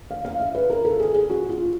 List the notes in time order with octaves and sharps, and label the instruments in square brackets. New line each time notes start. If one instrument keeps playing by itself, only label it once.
[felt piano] F5
F5
E5
B4
A#4
A4
G#4
G#4
F#4
F4